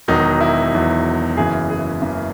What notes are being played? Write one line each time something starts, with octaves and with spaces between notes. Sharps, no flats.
E1 E2 D#3 F#3 D#4
E4
E1 E2 D#3 F#3
F#1 F#2 C#3 E3 G#4
G#4
F#1 F#2 C#3 E3